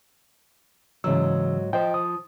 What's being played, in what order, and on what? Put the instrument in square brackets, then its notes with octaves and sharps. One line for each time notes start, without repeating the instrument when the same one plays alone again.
[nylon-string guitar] G#2 F#3 [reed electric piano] C#3 E3 E6
[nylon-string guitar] F3 [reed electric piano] C5 D#5 G5
[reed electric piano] D#6